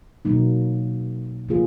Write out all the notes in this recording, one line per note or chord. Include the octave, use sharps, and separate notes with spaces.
B2 F#3 A#3 D#4
C#3 F3 A#3 F4 G#4